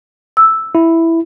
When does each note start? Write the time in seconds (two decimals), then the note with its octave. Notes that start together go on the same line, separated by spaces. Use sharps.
0.37 E6
0.75 E4